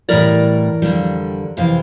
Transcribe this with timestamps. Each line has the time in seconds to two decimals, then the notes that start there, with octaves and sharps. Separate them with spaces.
0.09 A2 E3 G3 A#4 D5
0.82 F2 D3 G3
1.57 F2 C3 E3 F5